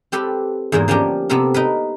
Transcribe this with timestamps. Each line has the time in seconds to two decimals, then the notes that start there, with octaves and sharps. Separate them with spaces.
0.12 C4 G4 A4 B4
0.72 E2 G#2 E3 A#3
0.88 F3 A#3 C#4 D4 G4 A#4
1.29 C3 B3 C4 A4 A#4
1.54 D#4 A#4 B4